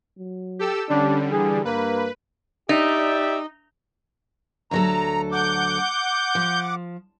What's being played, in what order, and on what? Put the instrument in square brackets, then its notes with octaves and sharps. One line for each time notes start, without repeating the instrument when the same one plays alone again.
[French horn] F#3
[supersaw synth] G4 A4 E6
[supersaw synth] D3 G3 [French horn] C#4 [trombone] D4
[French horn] E3 [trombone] G#4
[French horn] G2 [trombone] A#3 [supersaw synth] B4
[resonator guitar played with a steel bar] D#4 [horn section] G4 D5 E5
[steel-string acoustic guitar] D2 F#3 A4 [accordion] A#5
[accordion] F#5 D6 [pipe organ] G6
[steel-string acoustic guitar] F3